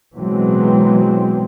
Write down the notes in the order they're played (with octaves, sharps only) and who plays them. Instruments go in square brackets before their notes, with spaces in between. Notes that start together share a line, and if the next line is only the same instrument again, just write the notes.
[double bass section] B2 E3 F#3 G#3 C4